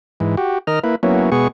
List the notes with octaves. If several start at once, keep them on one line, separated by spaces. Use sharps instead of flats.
G#2 E3
F#4 G4
D#3 A#4 D#5 F6
A#3 E4 B4
F#3 A#3 B3 C#4 E4
B2 G#3 B3 G#4 C#6